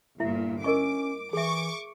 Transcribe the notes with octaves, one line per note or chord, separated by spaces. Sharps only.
G1 A#2 E4 E5
C#4 A#4 D#5 C#6 D6
E3 G#4 E5 C#6 D6